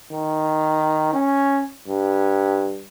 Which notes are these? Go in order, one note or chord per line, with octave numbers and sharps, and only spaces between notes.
D#3
C#4
G2